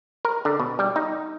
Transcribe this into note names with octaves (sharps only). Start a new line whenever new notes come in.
A#4
D3
B2
G3
D#4